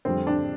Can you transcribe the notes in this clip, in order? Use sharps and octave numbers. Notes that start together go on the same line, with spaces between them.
F2 D3 G3 C4
D4